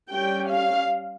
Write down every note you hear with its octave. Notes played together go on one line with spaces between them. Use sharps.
G3 C#4 G5
F5